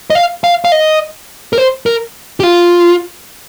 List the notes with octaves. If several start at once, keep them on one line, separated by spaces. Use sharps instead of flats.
D#5
F5
F5
F5
D#5
A#4
C5
A#4
G4
F4